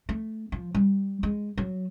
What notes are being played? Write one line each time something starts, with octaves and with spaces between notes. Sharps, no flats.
A3
F3
G3
G#3
F#3